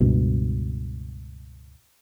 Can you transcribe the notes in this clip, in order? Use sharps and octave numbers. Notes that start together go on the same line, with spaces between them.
C#2 G2 B2